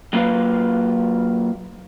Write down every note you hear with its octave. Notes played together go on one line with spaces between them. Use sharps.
F#3 A#3 F4 B4 F5